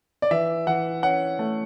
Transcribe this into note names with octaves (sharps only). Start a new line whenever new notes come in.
D5
E3 E5
E3 F#5
C#4 F#5
A3